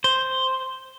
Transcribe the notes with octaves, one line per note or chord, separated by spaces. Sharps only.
C5